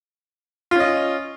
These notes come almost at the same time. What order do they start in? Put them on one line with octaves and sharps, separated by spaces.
F4 C#4 D#5